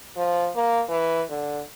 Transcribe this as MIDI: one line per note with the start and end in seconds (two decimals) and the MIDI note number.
0.17 0.50 53
0.55 0.83 58
0.89 1.22 52
1.30 1.62 50